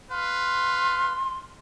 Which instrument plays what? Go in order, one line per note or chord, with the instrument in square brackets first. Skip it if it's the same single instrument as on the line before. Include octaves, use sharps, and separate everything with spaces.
[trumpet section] B4 F5 [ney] C6